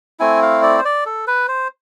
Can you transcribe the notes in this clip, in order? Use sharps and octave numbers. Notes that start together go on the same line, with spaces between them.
A3 C4 E4 G#5
F5
D5
C5
D5
A4
B4
C5